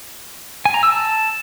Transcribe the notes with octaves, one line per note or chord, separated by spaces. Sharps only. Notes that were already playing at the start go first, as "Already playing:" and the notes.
G#5
A#5
E6
A5